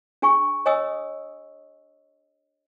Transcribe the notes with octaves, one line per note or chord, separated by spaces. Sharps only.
D4 G#4 G#5 C#6
C#5 D#5 G#5 D#6 E6